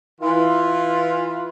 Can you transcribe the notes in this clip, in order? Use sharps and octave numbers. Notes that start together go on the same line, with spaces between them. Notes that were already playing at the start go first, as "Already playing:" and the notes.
E3 F4